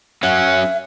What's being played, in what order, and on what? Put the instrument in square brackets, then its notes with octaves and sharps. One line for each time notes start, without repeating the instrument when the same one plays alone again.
[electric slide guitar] F#3 C#4 [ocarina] E5 [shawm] F#5